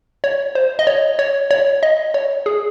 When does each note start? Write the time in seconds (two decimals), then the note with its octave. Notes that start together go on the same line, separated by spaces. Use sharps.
0.24 C#5
0.55 C5
0.79 D#5
0.87 C#5
1.19 C#5
1.51 C#5
1.83 D#5
2.14 C#5
2.46 G#4